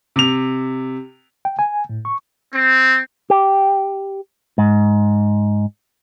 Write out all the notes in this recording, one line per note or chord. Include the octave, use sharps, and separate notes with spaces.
C3 F7
G5
G#5
A2
C#6
C4
G4
G#2